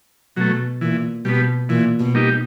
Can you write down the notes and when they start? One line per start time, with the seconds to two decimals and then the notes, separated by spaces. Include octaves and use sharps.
0.37 B2 F#3 A3
0.81 A#2 E3
1.25 B2 G3 B3
1.69 A#2 E3
2.00 B2
2.15 G3 A#3 D#4 G4